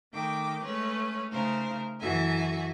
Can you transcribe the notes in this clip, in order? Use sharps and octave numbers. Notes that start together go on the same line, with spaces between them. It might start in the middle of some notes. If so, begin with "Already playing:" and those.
D#3 A3 G5 D6
G#3 A3 C#4 B4
C#3 A3 D#4 A#4 C5
F#2 E3 F#4 A4 E5 G#5